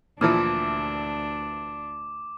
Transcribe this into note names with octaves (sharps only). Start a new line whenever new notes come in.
D2 A#2 E3 F3 D4 D6